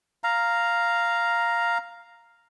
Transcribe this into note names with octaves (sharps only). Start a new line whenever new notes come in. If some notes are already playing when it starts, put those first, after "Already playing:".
F5 A#5